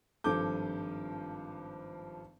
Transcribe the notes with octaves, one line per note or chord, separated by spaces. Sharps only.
G#1 G2 F3 A4 D6 G6